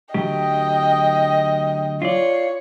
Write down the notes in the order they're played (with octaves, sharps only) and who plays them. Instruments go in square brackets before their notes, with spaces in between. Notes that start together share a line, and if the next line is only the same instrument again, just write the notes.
[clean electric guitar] D2 F#3 G4 [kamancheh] D#5 G5
[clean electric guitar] F4 D5 [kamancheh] C#5